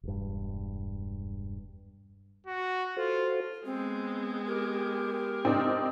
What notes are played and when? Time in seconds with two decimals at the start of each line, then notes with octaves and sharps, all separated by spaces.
0.03 E1 G2
2.46 F#4
2.97 F4 F#4 A4 C5
3.66 G#3 B3 C4
4.47 G4 A#4
5.45 C4 D4 D#4